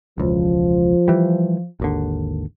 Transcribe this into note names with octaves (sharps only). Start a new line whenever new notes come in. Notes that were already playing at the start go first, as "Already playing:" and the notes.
E1 C#2 F3
E3 G3
G#1 D#2 D3